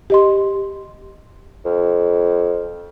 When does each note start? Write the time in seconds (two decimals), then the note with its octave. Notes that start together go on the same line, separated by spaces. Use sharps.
0.10 G4 D#5 C6
1.65 F2